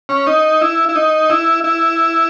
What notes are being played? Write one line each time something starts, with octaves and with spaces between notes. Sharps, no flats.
C#4
D#4
E4
E4
D#4
E4
E4